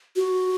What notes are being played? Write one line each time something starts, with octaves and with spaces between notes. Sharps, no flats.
F#4